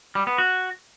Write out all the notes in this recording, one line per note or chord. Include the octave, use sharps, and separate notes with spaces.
G3
B3
F#4